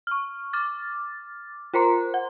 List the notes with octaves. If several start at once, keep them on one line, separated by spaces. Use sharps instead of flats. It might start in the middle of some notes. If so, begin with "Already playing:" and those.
C#6 F6
D6 F6 A6
F4 A#4 C5 A#5 C6
F#5